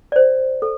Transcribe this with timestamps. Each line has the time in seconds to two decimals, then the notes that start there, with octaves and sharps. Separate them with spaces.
0.12 D5
0.16 C5
0.62 A4